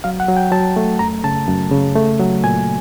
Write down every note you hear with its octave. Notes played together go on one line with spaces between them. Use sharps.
F#3 F5
F#5
F#3
G5
F#3 A5
A3
F#2 A#5
C#3 A5
F#2
C#3
A3
F#3
A#2 G#5